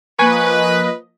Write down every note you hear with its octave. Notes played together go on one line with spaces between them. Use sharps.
F3 A#3 B4 D#5 G#5 C#6